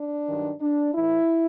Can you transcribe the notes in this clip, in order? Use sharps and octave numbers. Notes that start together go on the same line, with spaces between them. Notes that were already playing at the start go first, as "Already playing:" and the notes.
Already playing: D4
G2 D#3 F#3
D4
A2 E3 E4